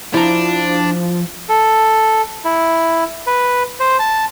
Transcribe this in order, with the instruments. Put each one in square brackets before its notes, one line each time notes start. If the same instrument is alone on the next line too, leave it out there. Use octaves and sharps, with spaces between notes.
[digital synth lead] F3 [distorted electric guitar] D4 [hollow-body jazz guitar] E4 A#5
[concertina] A4
E4
B4
C5
A5